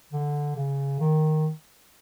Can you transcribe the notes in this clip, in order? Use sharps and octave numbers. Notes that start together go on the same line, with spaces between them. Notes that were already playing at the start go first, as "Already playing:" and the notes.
D3
C#3
D#3